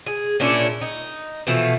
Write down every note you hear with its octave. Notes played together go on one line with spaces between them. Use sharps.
G#4
A#2 C#4 D4 E4
D#4
B2 E3 F3 A3